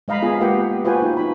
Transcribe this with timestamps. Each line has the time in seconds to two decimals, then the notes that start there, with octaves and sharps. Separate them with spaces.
0.08 G#3 D#5 F5 A#5 B5
0.22 B3 F4 G#4
0.40 G#3 A#3 G4 B4 F#5 G5
0.85 F4 F#4 B4 C5 G5 G#5
1.02 D#4
1.17 D#4 B5